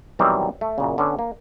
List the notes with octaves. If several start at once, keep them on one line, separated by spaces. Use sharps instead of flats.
B2 D#3 E3 F#3 G3 C4
A3
F#2 A#2 C#3
D3 B3 C#4
A#3